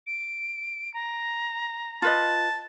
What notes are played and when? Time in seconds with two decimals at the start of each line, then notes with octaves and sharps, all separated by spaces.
0.07 D7
0.94 A#5
2.02 F4 B4 D#5 A5